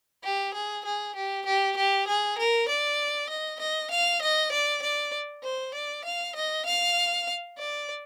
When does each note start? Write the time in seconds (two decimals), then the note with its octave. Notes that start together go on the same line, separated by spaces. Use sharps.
0.24 G4
0.54 G#4
0.85 G#4
1.15 G4
1.46 G4
1.77 G4
2.07 G#4
2.38 A#4
2.69 D5
3.29 D#5
3.60 D#5
3.91 F5
4.22 D#5
4.52 D5
4.82 D5
5.43 C5
5.74 D5
6.05 F5
6.36 D#5
6.66 F5
7.58 D5